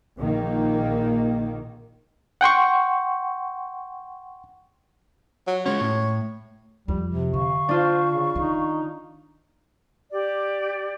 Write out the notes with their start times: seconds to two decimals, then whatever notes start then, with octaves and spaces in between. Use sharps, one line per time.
0.20 A#1 D#3 A#3
2.41 F#5 G5 C6 C#6
5.47 F#3
5.66 G#3 C#4 C#5
5.80 A2
6.88 F2 F3 G3
7.07 C3
7.33 D3 F5 C#6
7.69 D4 F4 C5
8.11 C#3
8.36 D#3 D#4
10.11 G4 D5